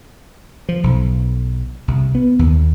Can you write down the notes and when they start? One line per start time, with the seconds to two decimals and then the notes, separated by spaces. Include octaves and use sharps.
0.69 F3
0.84 B1
1.88 C2
2.15 B3
2.39 D#2